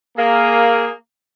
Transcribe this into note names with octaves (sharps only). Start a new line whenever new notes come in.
A#3 G#4